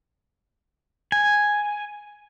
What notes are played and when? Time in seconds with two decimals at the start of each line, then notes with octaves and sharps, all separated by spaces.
1.12 G#5